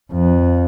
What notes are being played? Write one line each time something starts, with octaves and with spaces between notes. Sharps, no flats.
F2